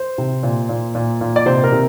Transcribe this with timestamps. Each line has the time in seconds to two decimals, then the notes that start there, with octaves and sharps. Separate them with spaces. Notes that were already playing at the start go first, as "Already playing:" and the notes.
Already playing: C5
0.18 C3
0.43 A#2
0.69 A#2
0.95 A#2
1.21 A#2
1.36 D5
1.46 C3 C5
1.64 A#4
1.72 C3